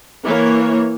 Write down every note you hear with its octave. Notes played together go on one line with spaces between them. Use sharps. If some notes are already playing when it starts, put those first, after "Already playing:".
E3 A#3 C#5